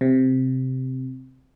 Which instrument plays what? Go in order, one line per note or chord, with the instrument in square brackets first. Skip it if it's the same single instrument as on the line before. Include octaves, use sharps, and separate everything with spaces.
[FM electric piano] C3